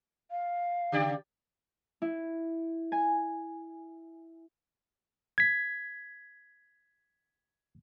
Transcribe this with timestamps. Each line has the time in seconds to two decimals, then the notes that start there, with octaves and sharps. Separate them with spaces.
0.31 F5
0.92 C#3 G4 D5
2.02 E4
2.92 G#5
5.38 G#6 B6